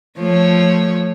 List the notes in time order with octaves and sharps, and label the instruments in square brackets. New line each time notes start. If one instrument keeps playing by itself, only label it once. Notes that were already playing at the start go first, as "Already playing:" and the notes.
[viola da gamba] F3 A3 C#5